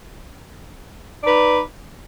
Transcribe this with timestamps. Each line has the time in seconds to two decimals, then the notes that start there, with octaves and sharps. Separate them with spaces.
1.21 D5
1.24 D#4
1.27 B4